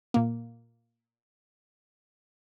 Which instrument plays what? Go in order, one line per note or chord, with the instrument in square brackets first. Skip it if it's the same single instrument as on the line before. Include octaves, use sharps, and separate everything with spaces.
[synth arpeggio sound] A#2 A#3